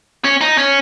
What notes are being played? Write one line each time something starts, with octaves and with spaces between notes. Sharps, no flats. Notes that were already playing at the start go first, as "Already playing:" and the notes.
C#4
D#4
C#4